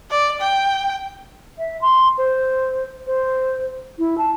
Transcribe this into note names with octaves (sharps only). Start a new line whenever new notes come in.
D5
G5
E5
C6
C5
C5
E4
A5